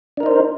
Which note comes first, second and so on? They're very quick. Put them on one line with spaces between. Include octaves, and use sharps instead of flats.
D4 A#4 D#4 C5